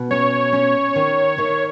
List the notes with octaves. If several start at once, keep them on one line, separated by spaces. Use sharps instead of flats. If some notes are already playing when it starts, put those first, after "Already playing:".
Already playing: B2
C#4 C#5
C#4
D#3
D#3